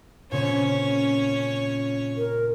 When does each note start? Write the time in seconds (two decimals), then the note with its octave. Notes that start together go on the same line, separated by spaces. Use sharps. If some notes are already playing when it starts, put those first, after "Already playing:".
0.31 A#2 C#3 C4 C#4 C#5
2.17 A#4